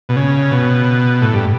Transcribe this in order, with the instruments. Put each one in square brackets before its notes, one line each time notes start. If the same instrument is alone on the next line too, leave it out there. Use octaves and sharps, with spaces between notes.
[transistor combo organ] B2
C#3
B2
A2
G2